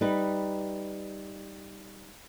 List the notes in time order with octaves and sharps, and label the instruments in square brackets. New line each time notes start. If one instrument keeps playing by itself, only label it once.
[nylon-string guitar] G3 D#4 B4